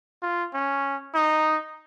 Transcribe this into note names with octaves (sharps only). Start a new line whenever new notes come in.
F4
C#4
D#4